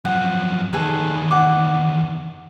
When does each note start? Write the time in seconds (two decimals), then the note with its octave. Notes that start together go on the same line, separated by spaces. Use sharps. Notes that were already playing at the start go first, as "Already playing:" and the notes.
0.05 F#2 F3 F#5
0.73 E2 D#3 G#4 A4 B4
1.31 F#5 D6